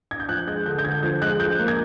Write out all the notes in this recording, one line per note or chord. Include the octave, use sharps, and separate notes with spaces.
G#6
G6
F3 F#6
G#3 G6
D3 G6
G6
D3 G#6
F3 G6
G#3 F#6
F3 G6
A#3
G#6